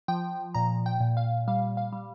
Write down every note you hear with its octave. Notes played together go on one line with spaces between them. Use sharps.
F3 G5
A#2 A#5
G5
A#2
F5
G3 F5
F5
G3